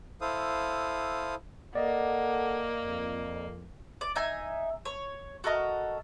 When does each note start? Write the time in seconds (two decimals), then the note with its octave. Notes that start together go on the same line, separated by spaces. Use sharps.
0.21 E4 A4 C5 F5 D#6
1.75 A#3 A4 D5 D#5 F#5
2.84 F2
4.01 D5
4.16 D#4 E5 G#5
4.85 C#5
5.44 F#4 A4 A#4 D#5